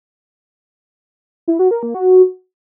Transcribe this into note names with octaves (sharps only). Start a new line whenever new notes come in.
E4
F#4
A#4
A#3
F#4